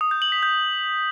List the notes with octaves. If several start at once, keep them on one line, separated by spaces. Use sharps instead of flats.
D#6
G6
F#7
B6
G6